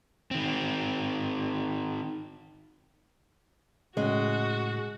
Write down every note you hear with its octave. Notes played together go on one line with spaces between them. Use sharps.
D#3 C4
A2 C#3 G#3 F#4